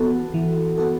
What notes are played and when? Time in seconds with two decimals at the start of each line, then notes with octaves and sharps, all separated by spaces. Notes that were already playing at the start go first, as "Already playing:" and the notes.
Already playing: E3 B3 F#4 A4
0.34 E3
0.78 B3 F#4 A4